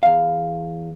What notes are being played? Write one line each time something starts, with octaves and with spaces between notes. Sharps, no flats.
E2 F5